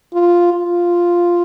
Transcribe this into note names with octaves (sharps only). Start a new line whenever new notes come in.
F4
F4